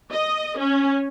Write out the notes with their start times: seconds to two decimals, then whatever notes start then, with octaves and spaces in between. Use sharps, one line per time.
0.12 D#5
0.58 C#4